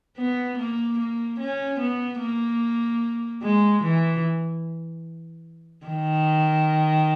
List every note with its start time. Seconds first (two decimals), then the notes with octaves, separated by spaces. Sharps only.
0.17 B3
0.58 A#3
0.99 A#3
1.40 C#4
1.80 B3
2.20 A#3
3.42 G#3
3.83 E3
5.86 D#3